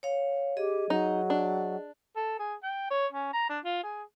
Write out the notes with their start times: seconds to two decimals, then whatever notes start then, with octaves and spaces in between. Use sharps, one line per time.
0.03 C#5 F5
0.57 G4 G#4 D#5
0.90 F#3 D#4
1.30 D4
2.16 A4
2.39 G#4
2.63 G5
2.91 C#5
3.13 C#4
3.34 A#5
3.50 D4
3.65 F4
3.83 G#4